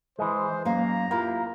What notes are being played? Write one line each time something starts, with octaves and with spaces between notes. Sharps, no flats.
E3 G#3 C5
F#2 A#3 F5 A#5
A#3 E4 F4 G4